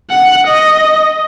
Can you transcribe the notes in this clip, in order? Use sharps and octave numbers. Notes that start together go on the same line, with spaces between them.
F#5
D#5